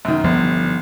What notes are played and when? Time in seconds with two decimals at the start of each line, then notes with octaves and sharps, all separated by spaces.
0.05 F#2 D#3
0.24 G1 F3 B3